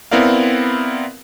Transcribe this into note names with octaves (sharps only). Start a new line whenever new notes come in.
B3 C4 E4 A#4 D5 F5